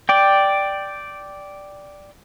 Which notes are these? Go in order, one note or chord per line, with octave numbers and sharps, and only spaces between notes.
D5 G5